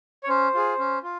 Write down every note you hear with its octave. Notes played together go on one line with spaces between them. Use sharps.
C#5
C#4 C5
F4 G#4
C#4
F4